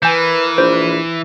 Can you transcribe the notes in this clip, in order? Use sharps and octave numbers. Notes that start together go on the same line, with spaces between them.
E3 A#4 B4 G#5 G6
A#1 C5